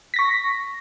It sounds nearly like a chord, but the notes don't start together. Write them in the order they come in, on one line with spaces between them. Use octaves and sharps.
B6 A#6 C#6